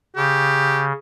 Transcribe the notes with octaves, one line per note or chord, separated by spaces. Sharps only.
C#3 G4